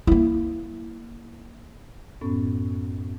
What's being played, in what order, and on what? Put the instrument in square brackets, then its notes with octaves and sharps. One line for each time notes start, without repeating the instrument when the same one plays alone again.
[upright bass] A#3 E4
[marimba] F#2 A2 B3 C#4